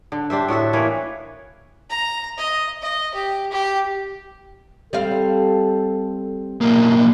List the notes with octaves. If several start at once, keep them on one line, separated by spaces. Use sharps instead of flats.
D3
D4 G4 C5 E5
A2 F#4 A4 E5
E3 A#3 B4 C#5
A#5
D#5
D#5
G4
G4
G3 C4 A4 F5
B1 A#3